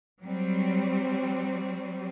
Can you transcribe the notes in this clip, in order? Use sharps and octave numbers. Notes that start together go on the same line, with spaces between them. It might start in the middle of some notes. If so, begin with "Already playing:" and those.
F#3 G3 C4